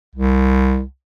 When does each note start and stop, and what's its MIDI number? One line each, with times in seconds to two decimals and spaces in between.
0.15 0.82 36